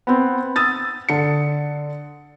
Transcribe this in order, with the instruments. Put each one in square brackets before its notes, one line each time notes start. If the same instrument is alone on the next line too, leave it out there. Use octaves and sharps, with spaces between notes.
[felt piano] B3 C4
D#6 E6 A6
D3 C#7